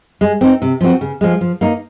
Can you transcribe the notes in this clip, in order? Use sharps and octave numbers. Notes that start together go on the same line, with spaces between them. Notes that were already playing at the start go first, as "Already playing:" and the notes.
G#3
C4 D#4
C3
F3 C4 F#4
C#3
F3 G#3
F3
A#3 D#4